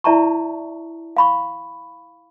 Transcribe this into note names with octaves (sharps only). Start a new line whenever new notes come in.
E4 D5 E5 A5 A#5 C#6
F5 B5 C#6